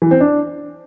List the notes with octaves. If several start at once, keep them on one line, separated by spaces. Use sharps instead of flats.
E3
C4
D4